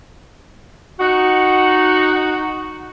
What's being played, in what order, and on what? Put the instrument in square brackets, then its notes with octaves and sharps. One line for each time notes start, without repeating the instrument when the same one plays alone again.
[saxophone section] D#4 F#5 [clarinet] F#4